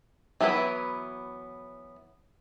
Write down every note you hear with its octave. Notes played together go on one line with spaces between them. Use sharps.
E3 F#3 B3 E4 B4